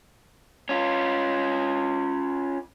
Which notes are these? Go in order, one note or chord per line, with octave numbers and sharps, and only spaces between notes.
C#4 F4